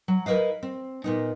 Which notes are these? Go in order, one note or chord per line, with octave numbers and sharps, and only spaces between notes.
F#3
E4 A#4 B4 D#5 F5
C4
A#2 B3 D#4